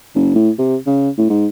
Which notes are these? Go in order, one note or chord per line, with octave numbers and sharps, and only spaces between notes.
F#1
A2
C3
C#3
A2
G#2